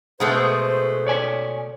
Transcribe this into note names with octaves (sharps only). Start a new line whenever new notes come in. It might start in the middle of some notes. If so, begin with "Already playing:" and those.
B2 G#3 A3 G#4 B4 C5
C#5 D5 G#5